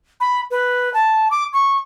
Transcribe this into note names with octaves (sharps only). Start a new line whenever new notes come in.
B5
B4
A5
D6
C#6